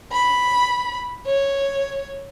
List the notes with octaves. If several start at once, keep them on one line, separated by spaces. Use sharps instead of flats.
B5
C#5